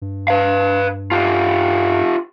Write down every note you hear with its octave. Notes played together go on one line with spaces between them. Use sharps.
G2
B4 F5
F4 G4